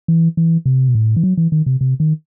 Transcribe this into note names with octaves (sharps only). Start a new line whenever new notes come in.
E3
E3
C3
B2
A2
E3
F#3
E3
D#3
C3
C3
D#3